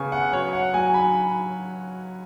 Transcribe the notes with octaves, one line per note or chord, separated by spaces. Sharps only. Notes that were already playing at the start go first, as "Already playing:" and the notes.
Already playing: C#3 B3 G#5 C#6
F#5
F#3 C#5
F#5
F#3 G#5
B5